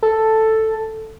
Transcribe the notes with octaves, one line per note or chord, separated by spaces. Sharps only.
A4